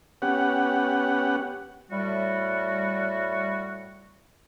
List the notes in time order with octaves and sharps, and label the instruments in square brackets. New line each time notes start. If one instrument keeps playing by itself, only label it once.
[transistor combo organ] B3 C#4 G4 F#5
[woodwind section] A2 G3 F#4